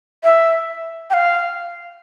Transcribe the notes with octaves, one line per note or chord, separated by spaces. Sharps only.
E5
G5
F5